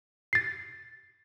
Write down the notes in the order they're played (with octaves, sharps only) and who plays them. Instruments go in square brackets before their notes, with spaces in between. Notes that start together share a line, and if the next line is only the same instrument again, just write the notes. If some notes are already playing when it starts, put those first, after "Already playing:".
[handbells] A6 C7